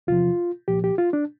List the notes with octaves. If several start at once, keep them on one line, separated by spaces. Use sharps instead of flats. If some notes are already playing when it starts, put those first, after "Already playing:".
E2 C3 F3 F4
C2 A#2 F3 G4
G4
F4
D4